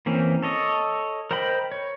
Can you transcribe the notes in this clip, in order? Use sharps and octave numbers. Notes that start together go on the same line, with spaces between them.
E3 A#3 C4 C#4
A4 C#5 D#5
A#4 C5 D#5 G5 B5
C#5